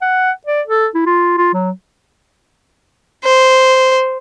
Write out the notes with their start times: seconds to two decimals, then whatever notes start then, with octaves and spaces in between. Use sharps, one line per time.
0.02 F#5
0.47 D5
0.67 A4
0.95 E4
1.06 F4
1.38 F4
1.54 F#3
3.24 C5